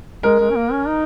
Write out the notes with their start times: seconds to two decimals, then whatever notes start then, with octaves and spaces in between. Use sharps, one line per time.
0.23 G#3 A#4
0.40 G#3
0.50 C#4
0.56 A#3
0.72 C#4
0.87 D#4